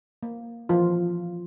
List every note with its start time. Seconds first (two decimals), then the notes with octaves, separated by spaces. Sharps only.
0.23 A#3
0.69 E3 F3 F4